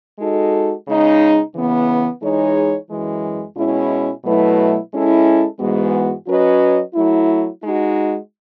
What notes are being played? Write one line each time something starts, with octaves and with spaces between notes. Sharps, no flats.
G#3 D#4 F#4 A4
C#3 G#3 D#4
C#3 E3 B3
E3 G#3 D#4 G#4 C#5
F#2 E3 G#3
B2 G#3 C#4 E4
B2 F#3 A3 E4 B4
G#3 C#4 E4 A4
G#2 E3 G#3 B3 F#4
F#3 C#4 F#4 B4 D#5
F#3 A3 E4
G#3 D#4 F#4